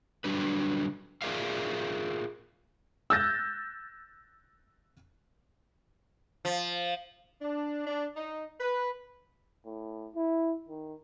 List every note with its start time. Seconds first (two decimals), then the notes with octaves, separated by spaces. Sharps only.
0.24 D3 F#3 G3 D4 B4
1.22 F4 G#4 A#4 D5 E5 F5
3.10 E6 F#6 G6 A6 A#6
6.45 F3
7.42 D4
7.87 D4
8.16 D#4
8.60 B4
9.66 A2
10.15 E4
10.68 D#3